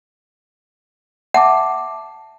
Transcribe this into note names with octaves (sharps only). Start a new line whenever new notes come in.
E5 F#5 A5 D6